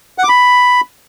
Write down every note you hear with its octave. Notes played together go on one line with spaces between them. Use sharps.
F#5
D6
B5